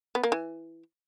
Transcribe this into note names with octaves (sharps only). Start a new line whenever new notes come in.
B3
A#3
E3